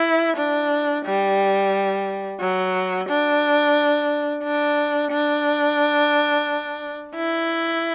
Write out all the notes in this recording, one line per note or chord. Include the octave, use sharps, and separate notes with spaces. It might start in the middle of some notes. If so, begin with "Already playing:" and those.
Already playing: E4
D4
G3
F#3
D4
D4
D4
E4